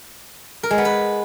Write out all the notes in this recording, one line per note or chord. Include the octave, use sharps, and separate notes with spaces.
A#4
G#3
B3
B4